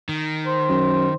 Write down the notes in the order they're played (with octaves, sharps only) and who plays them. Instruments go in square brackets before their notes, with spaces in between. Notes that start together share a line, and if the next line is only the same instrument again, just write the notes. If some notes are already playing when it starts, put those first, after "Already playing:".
[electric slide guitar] D#3
[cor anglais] C5
[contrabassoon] F#2